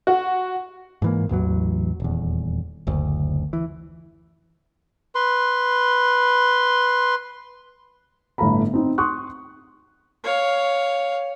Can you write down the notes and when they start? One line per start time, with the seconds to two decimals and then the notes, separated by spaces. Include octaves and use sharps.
0.07 F#4
1.02 G#2 E3 A#3
1.29 A1 E2 E3 F#3
2.00 D#1 E2
2.87 F#1 D2
3.53 E3
5.15 B4 C6
8.38 G1 A2 A3 F5 A#5 B5
8.73 C4 D#4
8.98 C6 C#6 D#6 F#6
10.24 C#5 F5